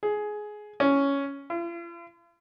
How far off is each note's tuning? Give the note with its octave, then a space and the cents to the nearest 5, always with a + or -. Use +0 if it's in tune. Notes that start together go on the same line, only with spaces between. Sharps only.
G#4 +15
C#4 +5
F4 -45